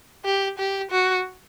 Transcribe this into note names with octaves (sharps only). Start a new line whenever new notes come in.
G4
G4
F#4